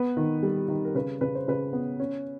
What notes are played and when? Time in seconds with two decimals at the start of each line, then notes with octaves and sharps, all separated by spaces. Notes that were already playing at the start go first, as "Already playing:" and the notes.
Already playing: B3 B4
0.17 D#3
0.43 G3
0.68 D#3
0.85 A#4
0.95 C#3 B4
1.21 C#3 B4
1.35 C5
1.48 C#3 B4
1.73 B3
2.00 C#4